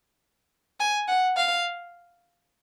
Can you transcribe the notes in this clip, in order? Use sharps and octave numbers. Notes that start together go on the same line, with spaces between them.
G#5
F#5
F5